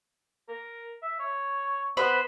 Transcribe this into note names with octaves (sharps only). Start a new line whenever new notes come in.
A#4
E5
C#5
B3 B4 C5 B5